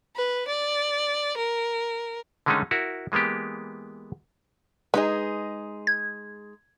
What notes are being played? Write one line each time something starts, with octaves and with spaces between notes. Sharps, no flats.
B4
D5
A#4
D3 D#3 G#3 A3 C#4 D#4
E4 F#4 A#4
E3 G#3 A#3 B3 G4
G#3 D#4 G#4 B4 D#5
G#6